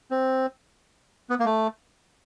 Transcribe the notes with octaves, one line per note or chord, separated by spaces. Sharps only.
C4
B3
A#3
A3